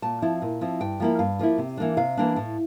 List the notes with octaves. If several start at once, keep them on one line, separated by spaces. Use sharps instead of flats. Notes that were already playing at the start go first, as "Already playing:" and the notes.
A#2 A5
F3 C4 E4
A#2
F3 C4 E4
G2 G5
F3 A#3 E4
G2 F5
F3 A#3 E4
C3
E3 A#3 D4
C3 F5
E3 A#3 D4
A2